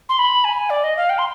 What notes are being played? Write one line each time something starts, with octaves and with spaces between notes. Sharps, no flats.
C6
B5
G#5
D5
D#5
F5
G5
C6